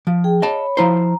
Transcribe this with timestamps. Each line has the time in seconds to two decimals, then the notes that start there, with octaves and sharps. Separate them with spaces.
0.07 F3
0.24 G#4 G5
0.42 C#5 D#5 F5 A5 B5
0.77 F3 E4 C5 A#5